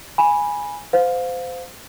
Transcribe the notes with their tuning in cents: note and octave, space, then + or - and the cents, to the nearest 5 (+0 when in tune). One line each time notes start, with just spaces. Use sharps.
G#5 -5 B5 -10
C5 -30 F5 +20